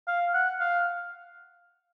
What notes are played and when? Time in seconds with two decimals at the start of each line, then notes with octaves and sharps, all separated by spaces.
0.07 F5
0.34 F#5
0.60 F5